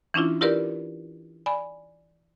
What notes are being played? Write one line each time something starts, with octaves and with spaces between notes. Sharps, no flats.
E3 C#4 D4 E4 F4
E4 F4 G4 A#4 B4 D5
D5 G#5 B5